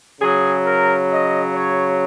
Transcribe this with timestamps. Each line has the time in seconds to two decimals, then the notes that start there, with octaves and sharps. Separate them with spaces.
0.21 C#3 F#3 G#4
0.65 A#4
1.09 D#5
1.54 C#5